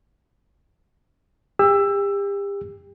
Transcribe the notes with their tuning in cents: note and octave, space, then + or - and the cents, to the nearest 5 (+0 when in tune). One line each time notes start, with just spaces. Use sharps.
G4 +35 E6 +15